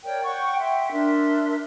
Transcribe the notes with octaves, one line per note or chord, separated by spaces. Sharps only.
A#4 C#5 D5 G5
F#5 G5 C#6
E5 G5 C6
D4 A#4 E5 C6